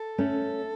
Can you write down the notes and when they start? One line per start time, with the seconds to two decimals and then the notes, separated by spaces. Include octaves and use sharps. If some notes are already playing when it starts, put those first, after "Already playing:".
Already playing: A4
0.18 A3 C#4